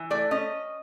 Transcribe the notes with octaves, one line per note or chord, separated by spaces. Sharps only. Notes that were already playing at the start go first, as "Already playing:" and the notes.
Already playing: E3
A3 D5
C#4 D#5